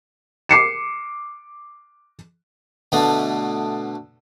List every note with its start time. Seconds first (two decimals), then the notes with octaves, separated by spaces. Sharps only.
0.49 D6 C7 C#7 E7
2.92 B2 D3 A3